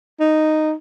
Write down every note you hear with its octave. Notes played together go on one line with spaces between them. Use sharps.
D#4